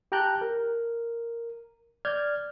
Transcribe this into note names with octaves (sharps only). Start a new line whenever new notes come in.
G4 G5 A5 A#5 F#6 G6
A#4
D5 F6 G6 G#6